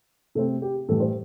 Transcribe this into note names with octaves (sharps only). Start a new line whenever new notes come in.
C3 A3 C4 A4
G4
A2 E3 G3 A4
C5